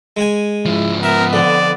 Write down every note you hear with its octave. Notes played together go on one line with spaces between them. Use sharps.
G#3 G#5
G#2 F3 E4
B3 A#4 E5
F2 D3 D5